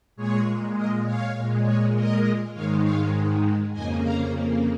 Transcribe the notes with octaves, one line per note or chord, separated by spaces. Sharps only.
A#2 G#3 G#4 C#5
A#4 D#5
C#5 F5
A#2 G#3
G#4 C#5
A#4 D#5
G#2 D#3 G#3 C#5 F5
C#5 F5
F2 C#3 A#3 D#5 G#5
F5 A#5